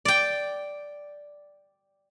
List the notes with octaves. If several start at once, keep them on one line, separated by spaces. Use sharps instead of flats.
D5 G5